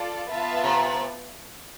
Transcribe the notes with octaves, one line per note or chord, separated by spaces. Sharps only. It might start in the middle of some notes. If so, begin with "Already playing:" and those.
Already playing: F4 A4 D5
B3 F4 B4 E5 A5
C3